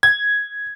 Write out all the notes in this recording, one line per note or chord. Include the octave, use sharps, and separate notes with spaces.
G#6